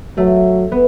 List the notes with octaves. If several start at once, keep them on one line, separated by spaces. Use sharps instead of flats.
F#3 A3
B3